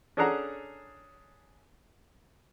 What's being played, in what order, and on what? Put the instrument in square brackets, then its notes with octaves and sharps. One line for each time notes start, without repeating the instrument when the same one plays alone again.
[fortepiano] C#4 D4 G#4 A4 F#5 A#5